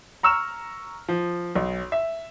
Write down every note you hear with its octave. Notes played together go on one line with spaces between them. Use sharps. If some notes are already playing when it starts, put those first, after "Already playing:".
A#5 C#6 E6 F6 E7
F3
B1
E5